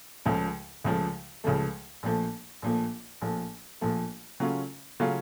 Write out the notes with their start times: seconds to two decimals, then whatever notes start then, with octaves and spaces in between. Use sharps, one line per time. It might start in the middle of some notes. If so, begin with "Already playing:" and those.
0.25 C#2 C#3 F3 A3
0.84 C#2 C#3 F3 A3
1.44 C#2 C#3 F3 A3
2.03 A#1 A#2 F3 A3
2.62 A#1 A#2 F3 A3
3.22 A#1 A#2 F3 A3
3.81 A#1 A#2 F3 A3
4.40 C#3 F#3 A3 C#4 F4
5.00 C#3 F#3 A3 C#4 F4